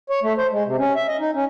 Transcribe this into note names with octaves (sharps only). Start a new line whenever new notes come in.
C#5
A3
C5
G#3
C3
C#4
E5
D#5
D#4
C#4